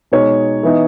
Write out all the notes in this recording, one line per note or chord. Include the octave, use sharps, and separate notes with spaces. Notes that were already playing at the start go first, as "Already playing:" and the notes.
B2 G#3 D#4 C#5
E3 B3 D#4